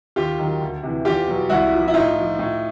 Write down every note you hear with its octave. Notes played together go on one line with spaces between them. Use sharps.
D#2 F4 G4
D#3 F#3
D2
C3 E3
E2 F4 G4
B2 F#3
C2 E4 F#4
A#2 F3
E4
A2 D#4 F4
F3
A2